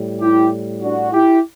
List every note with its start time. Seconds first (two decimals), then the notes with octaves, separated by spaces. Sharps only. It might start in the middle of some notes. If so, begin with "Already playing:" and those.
Already playing: A2 G3
0.21 E4 G4
0.82 D4 F#4
1.13 E4 G4